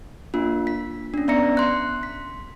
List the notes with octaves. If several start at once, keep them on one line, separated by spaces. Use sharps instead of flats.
A#3 D4 F4
B6
C#4 D4
B3 D5 E5 A#5 A#6 C#7
C6 F#6
B6